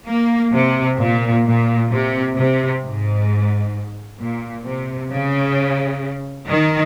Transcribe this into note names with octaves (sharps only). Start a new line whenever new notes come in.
A#3
C3
A#2
A#2
C3
C3
G#2
A#2
C3
C#3
D#3